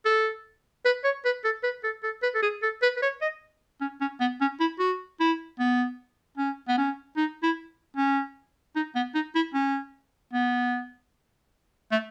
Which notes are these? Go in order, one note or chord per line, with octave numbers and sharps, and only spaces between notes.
A4
B4
C#5
B4
A4
B4
A4
A4
B4
A4
G#4
A4
B4
B4
C#5
D#5
C#4
C#4
B3
C#4
E4
F#4
E4
B3
C#4
B3
C#4
D#4
E4
C#4
D#4
B3
D#4
E4
C#4
B3
A3